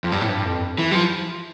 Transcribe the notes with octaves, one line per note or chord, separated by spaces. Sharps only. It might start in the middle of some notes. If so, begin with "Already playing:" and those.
F2
G2
A2
G2
F2
E3
G3
F3